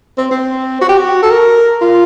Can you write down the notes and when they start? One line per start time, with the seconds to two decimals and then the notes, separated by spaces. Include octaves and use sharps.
0.18 C4
0.31 C4
0.81 F#4
0.89 G4
0.98 F#4
1.23 A4
1.31 A#4
1.81 F4